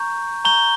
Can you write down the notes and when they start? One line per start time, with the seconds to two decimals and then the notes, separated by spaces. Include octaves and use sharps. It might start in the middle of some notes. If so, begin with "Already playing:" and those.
Already playing: A#5 C#6 G6
0.45 A#5 C#6 G6 G7